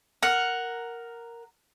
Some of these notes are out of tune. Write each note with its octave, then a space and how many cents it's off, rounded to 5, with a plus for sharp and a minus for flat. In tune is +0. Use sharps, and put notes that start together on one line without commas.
A#4 +0 F#5 +0